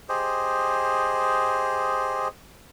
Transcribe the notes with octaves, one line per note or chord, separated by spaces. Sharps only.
G4 G#4 C5 D#5